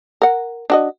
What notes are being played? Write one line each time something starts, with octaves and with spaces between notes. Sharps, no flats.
A#4 F#5
D4 F#4 D#5